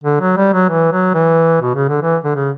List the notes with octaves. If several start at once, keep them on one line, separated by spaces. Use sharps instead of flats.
D3
F#3
G3
F#3
E3
F#3
E3
B2
C#3
D3
E3
D3
C#3